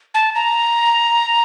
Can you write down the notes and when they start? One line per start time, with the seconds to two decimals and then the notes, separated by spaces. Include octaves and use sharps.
0.14 A5
0.35 A#5